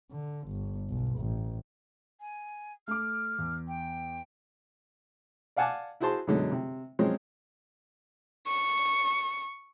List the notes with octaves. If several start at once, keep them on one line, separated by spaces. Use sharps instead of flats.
D3
G1
B1
A1
G#5
A3 D6 F6
E2
G5
D5 F5 F#5 G#5 A5 D6
E4 F#4 G#4 C5 A5 C6
F#2 B2 D3 F#3 G#3
C3
F3 F#3 G#3 C4 C#4
C#6